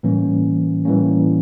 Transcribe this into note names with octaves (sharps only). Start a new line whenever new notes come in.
A2 E3 G3 A#3 C#4
A2 E3 G3 A#3 C#4